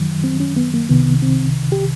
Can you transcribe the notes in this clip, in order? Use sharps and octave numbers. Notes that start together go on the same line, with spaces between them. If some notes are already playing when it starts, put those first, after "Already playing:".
Already playing: F#2 D#3 F#3
C4
C#4
B3
A#3
C2 C3 D#3 B3
C4
G4